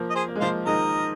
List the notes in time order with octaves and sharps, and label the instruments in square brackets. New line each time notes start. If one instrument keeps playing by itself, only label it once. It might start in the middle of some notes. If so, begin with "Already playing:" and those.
Already playing: [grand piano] F3 A#3
[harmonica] D#5
G#4 C5
[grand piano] A#3
G#3
[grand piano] F3 A#3 [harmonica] C5 F5
[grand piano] D#3 G#3 [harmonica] A#4 D#5